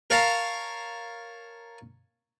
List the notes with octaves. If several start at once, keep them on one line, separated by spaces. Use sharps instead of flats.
A#4 C#5 F5 A5 A#5